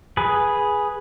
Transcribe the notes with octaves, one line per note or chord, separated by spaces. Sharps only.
G#4 B4